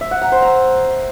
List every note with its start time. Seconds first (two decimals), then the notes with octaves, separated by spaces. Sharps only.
0.01 E5
0.11 F#5
0.22 A#5
0.32 C5
0.42 A#5